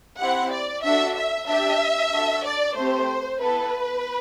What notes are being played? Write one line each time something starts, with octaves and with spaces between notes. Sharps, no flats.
C4 E4 G4 F#5
D5
D4 F#4 A4 E5
E5
D4 G4 E5
D4 F#4 A4
D5
A3 C4 G4 C5
B3 E4 A4 B4